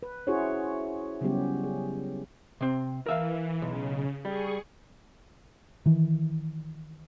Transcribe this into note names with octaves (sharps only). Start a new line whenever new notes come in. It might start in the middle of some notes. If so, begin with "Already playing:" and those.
B4
C#4 E4 F#4 G#4 C5 C#5
C#3 F#3 G3 B3 C#4 G4
G#4
C3 C4
E3 A#4 E5 F5
B1 C#3
G3 G#4 C#6
D#3 E3